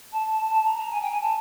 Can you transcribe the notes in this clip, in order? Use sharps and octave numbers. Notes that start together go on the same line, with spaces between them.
A5
A5
A#5
A#5
G#5
G5
G#5
A5